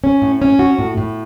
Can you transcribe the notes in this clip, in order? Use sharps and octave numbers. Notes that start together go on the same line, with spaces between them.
C#4
A2
C#4
F#4
A2
A2